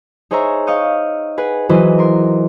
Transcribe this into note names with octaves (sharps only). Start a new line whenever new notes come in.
D#4 G#4 C5 C#5 E5 A#5
D#5 F5 C#6 D#6 G6
G#4 B4 F#5
E3 F#3 F#4 B4 C5 D#5
A#4 C6